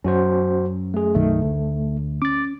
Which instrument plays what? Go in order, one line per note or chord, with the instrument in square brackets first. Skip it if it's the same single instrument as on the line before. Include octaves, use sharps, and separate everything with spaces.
[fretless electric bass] F#2 [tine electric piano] C#4 F#4 C5
[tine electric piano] A3 G#4
[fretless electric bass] B1 F#2 D#3 [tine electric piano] A3
[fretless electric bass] D2
[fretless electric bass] C#4 [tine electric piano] D6 A6